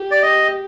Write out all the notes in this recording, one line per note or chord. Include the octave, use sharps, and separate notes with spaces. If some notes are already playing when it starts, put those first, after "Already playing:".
Already playing: G4
D5
D#5